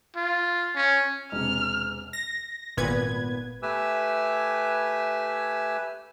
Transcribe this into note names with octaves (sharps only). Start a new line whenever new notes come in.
F4
C#4
E1 C3 F6
A#6
G#1 A#2 B3 B4 G#6
A3 G4 B4 G#5 E6